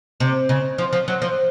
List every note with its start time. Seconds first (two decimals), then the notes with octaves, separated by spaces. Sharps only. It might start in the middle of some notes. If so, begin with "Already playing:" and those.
0.20 C3
0.49 C#3
0.78 F3
0.93 F3
1.08 F#3
1.22 F3